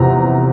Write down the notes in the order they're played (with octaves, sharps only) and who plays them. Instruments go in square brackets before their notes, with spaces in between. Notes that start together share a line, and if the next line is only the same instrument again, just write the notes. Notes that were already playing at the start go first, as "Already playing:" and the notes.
Already playing: [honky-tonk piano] E2 C3 F3 A#5